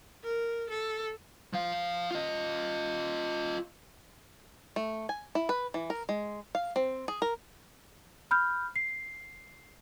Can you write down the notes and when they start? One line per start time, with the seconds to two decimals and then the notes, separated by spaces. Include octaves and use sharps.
0.23 A#4
0.70 A4
1.53 F3 F5
2.11 F4 D#5
4.76 A3
5.09 G#5
5.35 E4
5.49 B4
5.74 E3
5.90 A#4
6.09 G#3
6.55 F5
6.76 C4
7.08 G#4
7.22 A#4
8.31 B5 F6 G6
8.76 C7